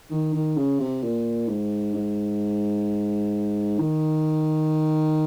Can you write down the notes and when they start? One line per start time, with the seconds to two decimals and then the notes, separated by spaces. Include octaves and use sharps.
0.11 D#3
0.34 D#3
0.57 C#3
0.80 C3
1.03 A#2
1.48 G#2
1.94 G#2
3.79 D#3